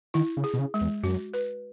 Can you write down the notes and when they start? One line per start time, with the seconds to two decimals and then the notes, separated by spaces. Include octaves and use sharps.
0.14 D#3 E4
0.37 C#3
0.44 G#4
0.54 B2
0.59 C#3
0.74 G#3
0.81 E2
1.03 F#2 F#4
1.34 B4